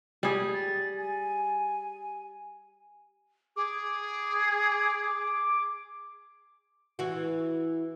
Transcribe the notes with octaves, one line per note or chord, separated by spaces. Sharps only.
G3 G#4
A6
G#5
G#4 D6
E3 F#4